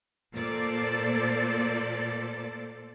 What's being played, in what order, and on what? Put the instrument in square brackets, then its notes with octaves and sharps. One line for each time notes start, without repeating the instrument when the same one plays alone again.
[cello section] A#2 A4 C5 D5